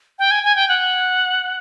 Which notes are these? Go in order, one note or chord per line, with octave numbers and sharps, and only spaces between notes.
G5
G#5
G#5
G5
F#5